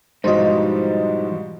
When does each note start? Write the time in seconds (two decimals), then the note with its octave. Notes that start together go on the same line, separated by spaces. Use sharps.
0.24 G#2 B2 E3 F3 G3 D#4 C5 D#5